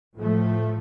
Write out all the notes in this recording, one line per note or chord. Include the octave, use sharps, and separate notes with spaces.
A2 F3 A3